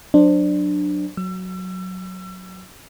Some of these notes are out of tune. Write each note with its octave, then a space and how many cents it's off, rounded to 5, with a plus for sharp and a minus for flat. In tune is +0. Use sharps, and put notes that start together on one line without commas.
F#3 +0 D4 +15 C5 +0
F#3 +0 E6 +35